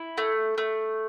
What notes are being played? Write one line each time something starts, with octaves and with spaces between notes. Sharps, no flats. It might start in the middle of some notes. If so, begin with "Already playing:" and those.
Already playing: E4
A3
A3